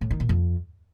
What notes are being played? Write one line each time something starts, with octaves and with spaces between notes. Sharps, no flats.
A2
D#3
A#2
F2